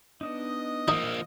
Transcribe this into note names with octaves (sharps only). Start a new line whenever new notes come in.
B3 D4 D#4 D#5
F3 A#3 D#4 E5 F5